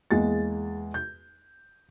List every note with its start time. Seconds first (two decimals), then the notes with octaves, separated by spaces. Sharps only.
0.11 E2 G#3 A#3 A6
0.94 G6